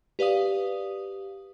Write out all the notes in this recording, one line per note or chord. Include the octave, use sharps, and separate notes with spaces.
G4 B4 D5 F5 D#6